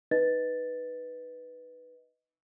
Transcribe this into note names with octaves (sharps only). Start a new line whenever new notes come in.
D#4 B4 D#5 A6